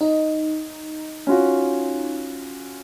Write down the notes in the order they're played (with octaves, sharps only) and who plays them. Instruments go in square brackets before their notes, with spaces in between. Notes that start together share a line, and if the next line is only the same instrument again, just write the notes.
[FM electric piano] D#4 [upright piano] D#5
[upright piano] C#4 F4 F#4